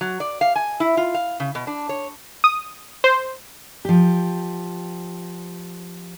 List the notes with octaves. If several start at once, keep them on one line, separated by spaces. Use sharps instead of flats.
F#3
D5
F5
G#5
E4
F4
F5
C#3
B2
D4
C#5
D#6
C5
F3 G4